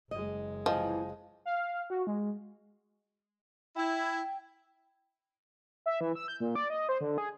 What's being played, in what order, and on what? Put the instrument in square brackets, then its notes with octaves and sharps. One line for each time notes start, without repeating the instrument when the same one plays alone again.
[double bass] F#1 G#3 [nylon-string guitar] D#5
[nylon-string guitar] C3 E3 [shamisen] F3 [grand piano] D#5 G#5
[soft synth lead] F5
F#4
G#3
[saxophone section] E4 [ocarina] G5
[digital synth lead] E5
E3
E6
G6
A#2
D5
D#5
C5
D3
G#4